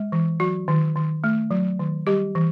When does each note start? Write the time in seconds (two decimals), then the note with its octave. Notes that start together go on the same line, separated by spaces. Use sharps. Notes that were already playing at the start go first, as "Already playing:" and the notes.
Already playing: G#3
0.12 E3
0.40 F#3 F#4
0.68 D#3
0.96 D#3
1.24 A3
1.51 F#3
1.79 D#3
2.07 G3 G4
2.35 E3